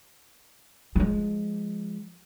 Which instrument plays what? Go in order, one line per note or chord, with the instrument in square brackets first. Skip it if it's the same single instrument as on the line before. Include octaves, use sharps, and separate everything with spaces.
[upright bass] F3 G#3